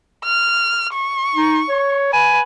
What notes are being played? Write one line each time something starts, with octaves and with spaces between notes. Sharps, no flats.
F6
C#6
D#4
C#5
B4 G#5